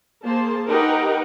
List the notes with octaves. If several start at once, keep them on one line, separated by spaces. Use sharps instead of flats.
A#3 G#4 C5 A5
D#4 G4 A#4 B4 F#5 G5